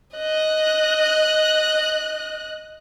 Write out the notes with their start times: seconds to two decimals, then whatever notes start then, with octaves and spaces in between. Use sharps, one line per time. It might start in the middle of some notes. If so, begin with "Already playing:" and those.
0.15 D#5 F#6